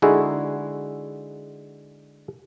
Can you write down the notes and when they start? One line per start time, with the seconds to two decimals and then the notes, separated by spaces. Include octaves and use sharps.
0.02 D3 G#3 D#4 E4 F#4 G#4